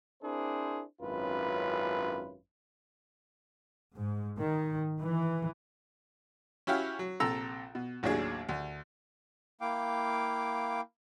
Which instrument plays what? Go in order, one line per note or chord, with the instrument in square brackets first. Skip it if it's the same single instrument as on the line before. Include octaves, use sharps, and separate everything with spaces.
[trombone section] C4 D4 E4 G#4 A#4 C5
G#1 F#2 C#4 E4 F4 B4
[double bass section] G#2
D#3
E3
[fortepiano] C#4 E4 F#4 G4 F5
F#3
A#1 C3 A4 A#5 E6
B2
A1 D#2 F#3 D4 G#4
D2
[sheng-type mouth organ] A#3 E4 F5 G5 D6